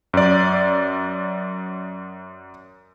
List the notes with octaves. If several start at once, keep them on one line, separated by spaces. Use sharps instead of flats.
F#2 D5